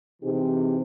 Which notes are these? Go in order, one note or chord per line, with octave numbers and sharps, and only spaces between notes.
C3 E3 C4 D#4 G4 G#4